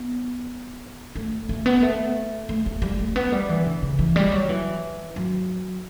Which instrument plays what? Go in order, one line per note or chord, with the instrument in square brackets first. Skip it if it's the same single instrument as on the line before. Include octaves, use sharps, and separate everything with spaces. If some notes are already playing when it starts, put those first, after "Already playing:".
Already playing: [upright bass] B3
A3
A3
B3
A3
A3
A3
G3
A3
B3
G3
E3
D3
C#3
E3
G3
F#3
E3
F#3